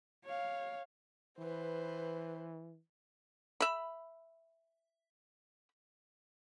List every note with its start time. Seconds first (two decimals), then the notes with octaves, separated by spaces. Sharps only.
0.24 C#5 F5
1.38 E3 B4 C5
3.60 E5 B5